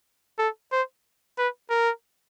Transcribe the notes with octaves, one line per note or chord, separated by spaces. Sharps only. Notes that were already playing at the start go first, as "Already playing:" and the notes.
A4
C5
B4
A#4